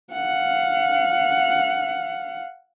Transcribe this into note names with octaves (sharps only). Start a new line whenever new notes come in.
F5 F#5